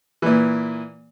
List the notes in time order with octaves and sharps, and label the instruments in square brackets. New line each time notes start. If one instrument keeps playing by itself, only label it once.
[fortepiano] A#2 E3